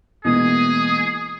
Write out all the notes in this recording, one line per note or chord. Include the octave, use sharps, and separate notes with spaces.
B2 E3 G#3 A#3 G#4 D#6